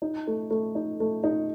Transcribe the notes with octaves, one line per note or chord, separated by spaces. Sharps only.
D#4
A3
A3
D#4
A3
D#4